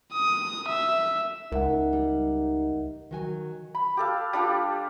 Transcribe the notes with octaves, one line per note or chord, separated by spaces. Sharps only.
D#6
E5
C#2 D#4 A#4 E5 F#5
G3
D#3 F#3 G#5
B5
G4 A4 F5
G3 D4 F4 G4